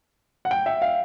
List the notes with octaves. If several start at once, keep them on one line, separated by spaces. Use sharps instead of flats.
F#5
G5
E5
F5